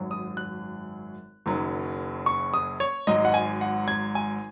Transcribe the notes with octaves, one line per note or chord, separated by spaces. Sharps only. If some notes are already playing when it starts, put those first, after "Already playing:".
Already playing: G#1 F#2 F#3
D#6
F#6
F#1 F#2 D#3 F#3
C#6
D#6
C#5
G#1 G#2 F#3 D#5
F#5
G#5
F#5
G#6
G#5